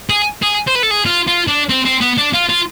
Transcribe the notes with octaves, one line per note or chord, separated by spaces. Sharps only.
G#4
G#4
C5
B4
A4
G#4
F4
F4
D4
C4
C4
B3
D4
F4
F4